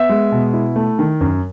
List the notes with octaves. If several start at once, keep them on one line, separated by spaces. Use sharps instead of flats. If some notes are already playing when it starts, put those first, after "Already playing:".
Already playing: B3 E5
G#3
B2
E4
A3
D#3
F#2